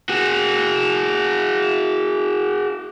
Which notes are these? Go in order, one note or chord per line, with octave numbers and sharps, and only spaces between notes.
F#4 G#4